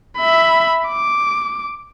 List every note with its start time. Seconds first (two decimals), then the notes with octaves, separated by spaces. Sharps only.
0.17 E5 B5
0.88 D6